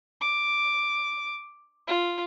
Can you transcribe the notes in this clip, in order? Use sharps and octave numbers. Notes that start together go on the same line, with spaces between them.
D6
F4